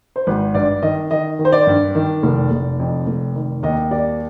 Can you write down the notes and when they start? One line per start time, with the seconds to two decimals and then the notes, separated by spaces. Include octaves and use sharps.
0.16 C5
0.27 G#1 B4
0.55 G2 D5
0.82 D#3 D#5
1.11 D#3 D#5
1.39 D#3
1.45 C5
1.52 D5
1.67 G2
1.95 D#3
2.23 F1
2.51 F1
2.80 F2
3.07 F1
3.36 D#3
3.63 D#2 D#5
3.91 G3 D5